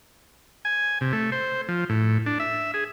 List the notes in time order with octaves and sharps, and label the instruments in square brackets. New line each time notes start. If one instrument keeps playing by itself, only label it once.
[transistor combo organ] G#5
C3
A3
C5
F3
A2
D4
E5
G#4